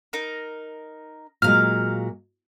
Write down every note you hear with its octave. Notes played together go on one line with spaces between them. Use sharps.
D#4 A#4
A#2 F#3 G#3 F5 F6